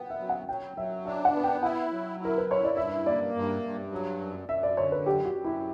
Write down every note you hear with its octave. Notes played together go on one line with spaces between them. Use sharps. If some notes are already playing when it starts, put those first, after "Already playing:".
Already playing: B3 F#5 G5
E5
F#3
F#5
F#3 G5
F#3 E5
D4 E5
F#5
B3
G5
E4 F#5
F#3
E4 A#4
B4
E4 C#5
D5
G2 E5
A#3 D5
G2
G2
F#3
F#2
F#2 E5
D5
D3 C#5
B4
F#2 G4
F#4
F#2
E4